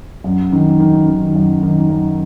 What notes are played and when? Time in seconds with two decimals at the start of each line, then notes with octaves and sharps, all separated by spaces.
0.24 F#2
0.52 D#3
0.80 D#3
1.07 D#3
1.35 F#2
1.63 D#3
1.90 F#2